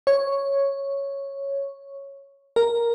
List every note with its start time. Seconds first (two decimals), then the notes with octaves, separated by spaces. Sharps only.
0.07 C#5
2.56 A#4